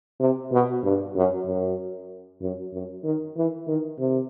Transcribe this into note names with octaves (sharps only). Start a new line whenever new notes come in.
C3
B2
G2
F#2
F#2
F#2
F#2
D#3
E3
D#3
C3